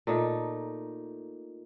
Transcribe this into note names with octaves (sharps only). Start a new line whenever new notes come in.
A#2 A3 D#4